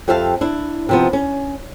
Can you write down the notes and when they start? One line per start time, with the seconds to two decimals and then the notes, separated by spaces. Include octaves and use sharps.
0.08 F2 C4 G4 E5 F5 A5
0.41 D4 E4
0.89 C3 F3 B3
1.13 C#4